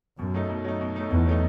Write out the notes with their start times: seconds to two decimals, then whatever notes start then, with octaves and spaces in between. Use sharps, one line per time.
0.18 F#2 B2
0.34 F#3 A3 D#4
0.50 B2
0.64 F#3 A3 D#4
0.81 B2
0.96 F#3 A3 D#4
1.11 E2 B2
1.27 F#3 A3 D#4